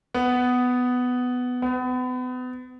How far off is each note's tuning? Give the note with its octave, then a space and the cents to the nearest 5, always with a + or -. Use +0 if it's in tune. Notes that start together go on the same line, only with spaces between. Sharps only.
B3 +10
B3 +35